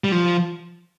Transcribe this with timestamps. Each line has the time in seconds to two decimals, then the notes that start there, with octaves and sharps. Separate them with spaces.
0.04 G3
0.12 F3